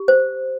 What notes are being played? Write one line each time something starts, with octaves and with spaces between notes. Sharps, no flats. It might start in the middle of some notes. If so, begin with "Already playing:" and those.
Already playing: G4
C5